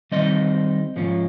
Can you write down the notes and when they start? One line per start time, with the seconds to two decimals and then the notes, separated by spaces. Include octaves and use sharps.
0.11 D#3 G3 C4 D#4 C5 D#5
0.96 G#2 F3 A#3 C#4 F4